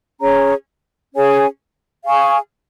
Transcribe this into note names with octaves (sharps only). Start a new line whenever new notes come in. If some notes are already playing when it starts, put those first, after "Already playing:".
C#4 G#4 C#5 A#5
C#4 G#4 C#5 G#5
G#4 F5 G#5 C#6